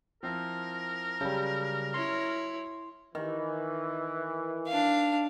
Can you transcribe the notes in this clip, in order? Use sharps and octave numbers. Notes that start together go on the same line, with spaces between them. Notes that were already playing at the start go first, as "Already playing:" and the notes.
F3 C4 E4 A#4
C#3 F#3 G3 A5 G6
E4 C#5 C6
D#3 E3
D4 F5